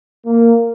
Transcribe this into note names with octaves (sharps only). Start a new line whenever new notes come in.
A#3